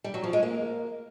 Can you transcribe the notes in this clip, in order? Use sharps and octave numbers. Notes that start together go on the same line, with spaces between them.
G3
F#3
F3
G#3
A#3